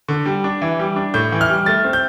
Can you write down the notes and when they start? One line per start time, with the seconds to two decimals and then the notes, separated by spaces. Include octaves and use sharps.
0.08 D3
0.26 G3
0.44 D4
0.61 E3
0.79 G3
0.96 D4
1.14 A2 G6
1.32 E3
1.41 F6
1.49 G3
1.66 A3 A6
1.84 C4
1.93 G6